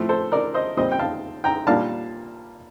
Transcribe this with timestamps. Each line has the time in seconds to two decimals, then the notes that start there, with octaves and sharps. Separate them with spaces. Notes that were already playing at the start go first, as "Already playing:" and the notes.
Already playing: A2 F3 A3 C4
0.09 A4 C5
0.32 A#4 D5
0.54 C5 D#5
0.77 A#2 G3 C4 C5 D#5
0.92 G5
0.99 F5 A5
1.44 G5 A#5
1.67 A#2 G3 A#3 D4 F5 A5